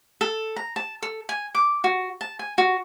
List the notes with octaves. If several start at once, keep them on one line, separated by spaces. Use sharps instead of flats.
A4
A#5
A5
A4
G#5
D6
F#4
A5
G#5
F#4